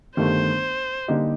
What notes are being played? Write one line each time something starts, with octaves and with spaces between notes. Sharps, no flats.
G1 G2 D#3 A3 C5
D3 G3 A#3 D#4 G4